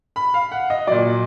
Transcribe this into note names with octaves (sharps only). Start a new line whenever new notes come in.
B5
F5
F#5
D#5
A#2 F#3 D5